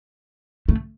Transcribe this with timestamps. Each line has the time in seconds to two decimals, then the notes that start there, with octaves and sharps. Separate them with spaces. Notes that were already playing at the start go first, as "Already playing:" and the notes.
0.69 A3